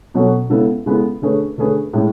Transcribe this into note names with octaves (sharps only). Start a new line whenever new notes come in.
B2 F#3 C#4 F#4 A4
C#3 G#3 B3 E4 A4
C#3 G#3 B3 E4 A4
D3 A3 C#4 G#4 B4
D3 A3 C#4 G#4 B4
A2 G#3 C#4